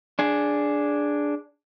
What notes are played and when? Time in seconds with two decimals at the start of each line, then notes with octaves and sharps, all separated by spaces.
0.19 D4 G#4